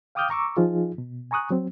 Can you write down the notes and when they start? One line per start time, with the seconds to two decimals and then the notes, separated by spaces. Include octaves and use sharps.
0.15 F5 G5 D6 D#6 F6 G6
0.30 A#5 C#6 D6 E6
0.57 F3 D#4 F4 G#4
0.98 B2
1.31 G#5 A#5 C#6 D#6 F#6
1.50 F#3 C4